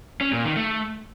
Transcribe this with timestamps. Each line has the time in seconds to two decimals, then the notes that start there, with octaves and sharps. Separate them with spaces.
0.21 C#4
0.33 A#2
0.45 D#3
0.57 A3